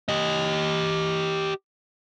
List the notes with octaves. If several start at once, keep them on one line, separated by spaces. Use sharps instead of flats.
G4 D#5